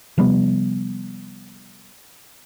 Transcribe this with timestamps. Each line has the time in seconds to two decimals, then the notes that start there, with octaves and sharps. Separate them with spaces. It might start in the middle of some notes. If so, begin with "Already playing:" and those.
0.18 C3 F3 G3 B3